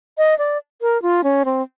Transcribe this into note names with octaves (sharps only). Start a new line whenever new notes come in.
D#5
D5
A#4
F4
C#4
C4